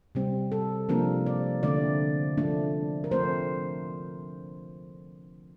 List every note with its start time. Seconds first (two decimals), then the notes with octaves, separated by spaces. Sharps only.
0.15 C3 G3 C4
0.52 A4
0.89 C3 F3 A#3 D4 A#4
1.26 D5
1.63 D3 A3 C4 D5
2.37 F3 A3 D4
3.04 A#4
3.11 F3 A3 C4 C5